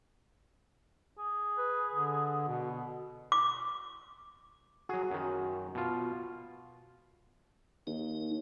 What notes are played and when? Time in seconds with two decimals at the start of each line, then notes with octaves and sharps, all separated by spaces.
1.18 G#4
1.58 B4
1.92 D3
2.48 B2
3.32 D6
4.89 F#3 F#4 G#4
5.10 F#2 D#3
5.75 B2 F4
7.87 D#2 D#4